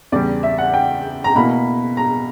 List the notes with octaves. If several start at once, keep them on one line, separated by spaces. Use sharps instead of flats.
E2 C#3 G3 D5
E5
F#5
G5
A#5
B2 A#3 E4 B5
A#5